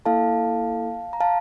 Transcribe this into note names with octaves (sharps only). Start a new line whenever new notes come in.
A#3 E4 A4 F5 A5
A#5
F5 A5